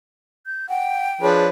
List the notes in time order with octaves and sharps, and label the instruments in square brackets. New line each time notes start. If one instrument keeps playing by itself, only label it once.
[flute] G6
[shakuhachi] F#5 [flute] G5
[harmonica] F3 D4 B4 [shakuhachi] G#4 [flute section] C#5